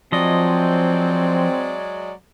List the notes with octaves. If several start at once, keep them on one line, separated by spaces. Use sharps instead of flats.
F3 F#3 G#3 C4 D5 D#5